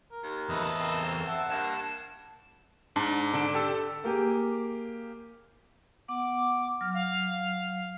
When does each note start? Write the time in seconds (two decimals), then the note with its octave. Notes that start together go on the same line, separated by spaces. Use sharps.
0.12 A#4
0.23 D#2
0.49 E2 A4 B4 D#5 E5
0.80 C4 A#4
1.26 E5 F#5 A5
1.50 G2 A#3 A5
2.96 G#2 D4
3.34 D3 A5
3.54 G4 A4 E6
4.04 A#3 G4 G#4
6.08 B3 F#5 D6
6.81 F#3 F6
6.94 F5